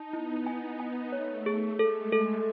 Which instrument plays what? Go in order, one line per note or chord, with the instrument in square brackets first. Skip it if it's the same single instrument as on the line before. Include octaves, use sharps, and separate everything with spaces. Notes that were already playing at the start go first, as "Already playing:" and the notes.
Already playing: [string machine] D#4 [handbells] A5
[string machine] B3 [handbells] E4
[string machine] B3 [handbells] G#5
[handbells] G#5
[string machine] A3 [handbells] C#5
[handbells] G#4
[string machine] G#3 [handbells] A4
[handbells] A4